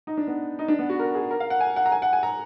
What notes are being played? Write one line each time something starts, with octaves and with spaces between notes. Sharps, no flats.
D#4
D4
B3
D#4
D4
B3
F#4
A#4
G#4
A#4
F5
F#5
G#5
F#5
A#5
G#5
F#5
G#5
A#5